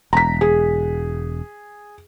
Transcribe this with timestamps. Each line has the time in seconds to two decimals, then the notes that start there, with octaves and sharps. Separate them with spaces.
0.13 E1 A#5 B6
0.41 G#4